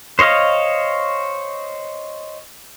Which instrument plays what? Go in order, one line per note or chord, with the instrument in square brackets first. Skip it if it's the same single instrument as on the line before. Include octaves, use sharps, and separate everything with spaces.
[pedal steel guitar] C5 C#5 D#5 F5